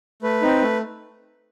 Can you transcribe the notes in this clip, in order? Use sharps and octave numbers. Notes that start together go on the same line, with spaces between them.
A3 B4
C4 D#4
A3